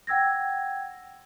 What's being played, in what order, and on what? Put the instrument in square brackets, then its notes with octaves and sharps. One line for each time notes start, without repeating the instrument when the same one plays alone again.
[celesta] F#5 G5 E6 G#6 A#6